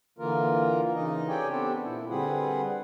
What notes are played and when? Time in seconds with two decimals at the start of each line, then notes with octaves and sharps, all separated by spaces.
0.19 D3 E3 A#3 F4 A#4
0.95 C#3 E3 D#4 D#5
1.28 G4 A4 C#5 D5 G5 G#5
1.49 B3 C4 D4 G4 A4
1.84 A#2 E4
2.10 D3 G3 C4 G#4 B4 F#5